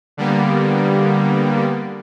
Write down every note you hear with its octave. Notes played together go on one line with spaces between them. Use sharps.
D3 G3 A#3 B3